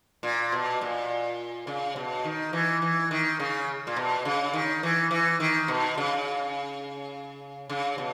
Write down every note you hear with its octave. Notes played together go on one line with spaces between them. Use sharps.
A#2
B2
A#2
C#3
B2
D#3
E3
E3
D#3
C#3
A#2
B2
C#3
D#3
E3
E3
D#3
B2
C#3
C#3
B2